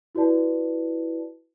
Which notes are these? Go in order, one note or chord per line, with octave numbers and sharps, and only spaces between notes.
E4 F#4 B4 D5 A5